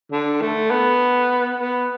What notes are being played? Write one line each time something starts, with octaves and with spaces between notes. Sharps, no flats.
D3
A3
B3
B3